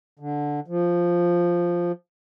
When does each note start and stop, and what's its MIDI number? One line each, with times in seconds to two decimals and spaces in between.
0.19 0.60 50
0.68 1.92 53